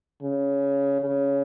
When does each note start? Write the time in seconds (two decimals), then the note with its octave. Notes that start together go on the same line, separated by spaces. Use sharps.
0.22 C#3
1.01 C#3